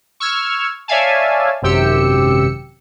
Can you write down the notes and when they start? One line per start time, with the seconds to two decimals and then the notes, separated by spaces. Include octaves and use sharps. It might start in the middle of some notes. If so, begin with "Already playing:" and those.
0.20 C#6 E6 F6 G#6
0.88 C#5 D5 E5 F5 G#5 A5
1.62 G#1 F#2 C3 G4 E6 C#7